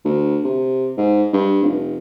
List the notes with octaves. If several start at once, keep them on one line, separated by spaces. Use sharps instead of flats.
D2
C3
G#2
G2
F1